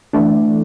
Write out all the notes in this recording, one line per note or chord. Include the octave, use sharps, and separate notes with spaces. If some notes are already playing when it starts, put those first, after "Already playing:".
E3 A3 D4